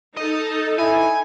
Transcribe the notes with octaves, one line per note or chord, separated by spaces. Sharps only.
D#4 A4 D#5
E4 G#5